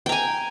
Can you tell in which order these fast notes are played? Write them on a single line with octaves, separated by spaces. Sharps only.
G5 A#5 G#5